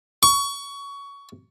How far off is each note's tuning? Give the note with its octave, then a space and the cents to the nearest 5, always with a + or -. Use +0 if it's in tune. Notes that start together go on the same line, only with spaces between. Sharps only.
C#6 +20